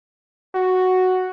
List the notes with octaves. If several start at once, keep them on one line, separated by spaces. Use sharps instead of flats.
F#4